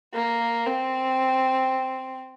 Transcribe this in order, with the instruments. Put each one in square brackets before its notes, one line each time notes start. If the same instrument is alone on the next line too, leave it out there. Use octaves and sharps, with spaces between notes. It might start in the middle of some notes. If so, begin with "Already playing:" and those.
[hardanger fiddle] A#3
C4